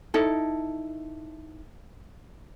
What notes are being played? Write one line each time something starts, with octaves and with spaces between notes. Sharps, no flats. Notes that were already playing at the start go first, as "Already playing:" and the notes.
D#4 E4 A4